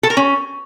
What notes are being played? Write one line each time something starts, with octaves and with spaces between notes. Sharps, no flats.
A4
A#4
C#4